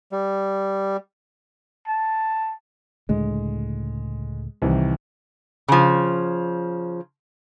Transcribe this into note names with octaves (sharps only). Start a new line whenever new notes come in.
G3
A5
C#2 A2 D3 G#3
C2 D#3 E3
C#3 F3